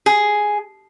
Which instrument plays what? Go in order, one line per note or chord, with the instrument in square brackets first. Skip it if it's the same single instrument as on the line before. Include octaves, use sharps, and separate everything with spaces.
[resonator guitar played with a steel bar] G#4